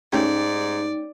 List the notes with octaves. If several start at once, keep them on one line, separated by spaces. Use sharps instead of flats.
G#2 A3 C#4 D#4 G4 D5